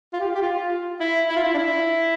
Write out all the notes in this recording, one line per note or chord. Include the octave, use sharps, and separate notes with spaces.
F4
G4
F4
G4
F4
F4
E4
E4
F4
E4
D4
E4